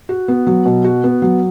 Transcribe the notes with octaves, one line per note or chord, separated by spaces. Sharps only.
F#4
B3
F#3
B2
F#4
B3
F#3